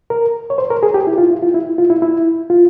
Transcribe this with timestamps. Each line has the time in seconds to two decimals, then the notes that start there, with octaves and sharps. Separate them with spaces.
0.10 A#4
0.50 C#5
0.58 C5
0.70 A#4
0.83 G#4
0.94 G4
1.07 E4
1.18 F4
1.31 E4
1.43 F4
1.54 E4
1.78 F4
1.90 E4
2.02 E4
2.50 F4